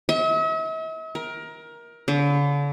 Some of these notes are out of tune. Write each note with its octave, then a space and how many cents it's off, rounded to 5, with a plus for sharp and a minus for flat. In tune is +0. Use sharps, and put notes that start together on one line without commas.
E5 -45
A#4 +20
D3 -40